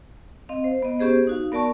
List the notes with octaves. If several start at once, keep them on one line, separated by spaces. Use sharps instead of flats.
C4 D#5 F5
C5
B3 D#5
B3 C#4 G4 G#4 C5
D#4 F#4 F5
B3 A#4 D5 A5 C#6